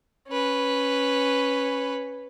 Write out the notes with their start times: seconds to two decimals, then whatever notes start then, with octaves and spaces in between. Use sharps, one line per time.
0.28 C#4 B4